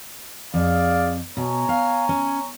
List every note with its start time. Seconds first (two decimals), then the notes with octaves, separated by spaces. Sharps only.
0.54 F2 G#4 D5 F5
1.37 B2 C#5 G#5 A#5
1.69 F5
2.09 C#4